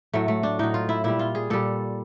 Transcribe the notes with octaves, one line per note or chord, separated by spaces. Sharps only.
A2 F#3 A3
A3
D4
A2 F#3 D#4
F4
E4
A#2 G3 E4
F4
G#4
A#2 G3 A4